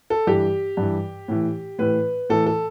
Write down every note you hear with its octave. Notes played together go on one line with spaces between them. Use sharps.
A4
G2 E3 G4
G2 E3
A2 E3
A2 E3 B4
A2 E3 A4
A4